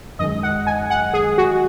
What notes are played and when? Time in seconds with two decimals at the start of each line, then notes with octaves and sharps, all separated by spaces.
0.19 F#2 D#3 G#3 D#5
0.43 F#5
0.67 G#5
0.90 F#5
1.14 G#4
1.38 F#4